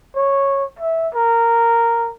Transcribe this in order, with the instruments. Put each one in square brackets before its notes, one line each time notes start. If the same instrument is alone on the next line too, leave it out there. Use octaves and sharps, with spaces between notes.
[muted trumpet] C#5
E5
A#4